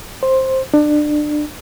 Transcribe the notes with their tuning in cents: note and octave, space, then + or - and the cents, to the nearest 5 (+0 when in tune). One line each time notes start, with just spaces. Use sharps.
C5 +10
D4 +25